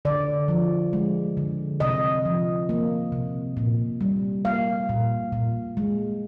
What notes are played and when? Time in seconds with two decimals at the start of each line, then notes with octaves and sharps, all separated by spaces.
0.05 D3 D5
0.48 F3
0.93 G#3
1.37 D3
1.80 C3 D#5
2.25 F3
2.69 A#3
3.12 C3
3.57 A#2
4.01 G3
4.45 A#3 F5
4.89 A#2
5.32 A#2
5.77 G#3